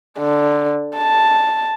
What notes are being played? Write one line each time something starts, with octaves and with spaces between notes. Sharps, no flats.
D3
A5